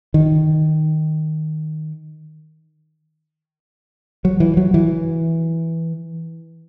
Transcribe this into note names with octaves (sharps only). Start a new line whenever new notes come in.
D#3
F#3
E3
F#3
E3